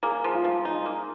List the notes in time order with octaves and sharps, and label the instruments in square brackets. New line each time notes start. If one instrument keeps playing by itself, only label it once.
[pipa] A#3 [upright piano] G#4
[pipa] F3
[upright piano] F4
[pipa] F3
[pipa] D#4 [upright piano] F4
[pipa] A#3